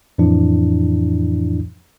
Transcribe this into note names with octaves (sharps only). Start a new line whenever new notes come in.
F2 A2 E3 F3 D4 E4